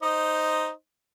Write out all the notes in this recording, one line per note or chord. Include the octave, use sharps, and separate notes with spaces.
D#4 C5 D#5